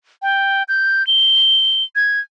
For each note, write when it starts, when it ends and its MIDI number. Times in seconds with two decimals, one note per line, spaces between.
0.22 0.63 79
0.68 1.05 91
1.07 1.83 103
1.96 2.20 92